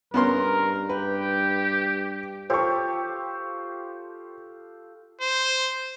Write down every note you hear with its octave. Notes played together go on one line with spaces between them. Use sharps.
G2 B3 C#4 A#4 C6
G4 B4 G5
F4 G4 A4 C5 C#6
C5